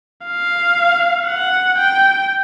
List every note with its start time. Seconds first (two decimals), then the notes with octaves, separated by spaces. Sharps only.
0.26 F5
1.27 F#5
1.78 G5